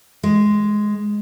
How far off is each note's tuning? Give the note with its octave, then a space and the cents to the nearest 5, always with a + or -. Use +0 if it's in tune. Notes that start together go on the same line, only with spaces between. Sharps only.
G#3 +5